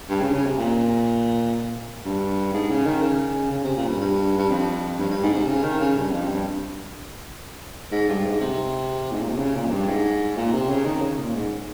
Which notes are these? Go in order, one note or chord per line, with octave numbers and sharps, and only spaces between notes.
G2
C#3
C#3
C3
A#2
G2
G#2
C#3
D#3
C#3
C#3
C3
A#2
G2
G2
G2
F2
G2
G2
G#2
C3
C#3
D#3
C#3
G2
F2
G2
G#2
G2
G#2
C3
G#2
A#2
C3
C#3
A#2
F2
G2
G#2
A#2
C3
C#3
D#3
C#3
A#2
G#2